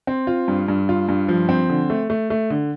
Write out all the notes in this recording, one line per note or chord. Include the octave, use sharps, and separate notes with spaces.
C4
F4
G2
G2
F4
G2
F3
C4
D3
A3
A3
A3
D3